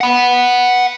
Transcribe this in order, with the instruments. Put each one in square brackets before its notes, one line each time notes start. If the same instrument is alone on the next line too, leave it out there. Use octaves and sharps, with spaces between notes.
[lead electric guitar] F#5 B5